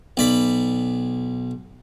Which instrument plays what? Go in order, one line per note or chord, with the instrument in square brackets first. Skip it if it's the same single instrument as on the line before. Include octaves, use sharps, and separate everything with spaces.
[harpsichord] B1 D5 B5